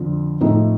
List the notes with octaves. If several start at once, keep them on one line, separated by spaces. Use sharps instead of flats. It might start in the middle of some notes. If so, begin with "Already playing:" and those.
Already playing: F2 D3 F3
A2 F3 A3 D#4